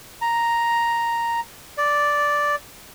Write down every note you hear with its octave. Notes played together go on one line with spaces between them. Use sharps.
A#5
D5